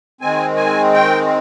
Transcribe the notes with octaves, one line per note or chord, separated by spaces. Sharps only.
D#3 G#3 C4 G#5
G#5
G5